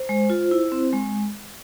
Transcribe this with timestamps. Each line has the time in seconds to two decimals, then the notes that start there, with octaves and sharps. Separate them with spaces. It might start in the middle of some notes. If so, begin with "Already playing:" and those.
Already playing: C5
0.09 G#3
0.30 F4
0.51 E4
0.72 C4
0.93 G#3